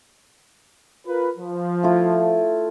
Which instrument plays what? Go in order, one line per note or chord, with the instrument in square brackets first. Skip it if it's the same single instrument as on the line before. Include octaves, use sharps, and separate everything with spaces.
[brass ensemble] F4 A#4 B4
F3
[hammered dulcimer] A3 E4 F4